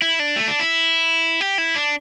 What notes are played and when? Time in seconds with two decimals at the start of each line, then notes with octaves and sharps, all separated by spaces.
0.02 E4
0.20 D4
0.36 A3
0.48 D4
0.59 E4
1.41 G4
1.58 E4
1.76 D4